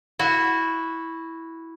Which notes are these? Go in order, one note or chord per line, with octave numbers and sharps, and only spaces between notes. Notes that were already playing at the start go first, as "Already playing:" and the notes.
E4 F#4